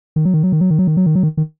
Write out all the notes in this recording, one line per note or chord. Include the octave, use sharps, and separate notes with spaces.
D#3
F#3
D#3
F#3
D#3
F#3
D#3
F#3
D#3
F#3
D#3
F#3
D#3
D#3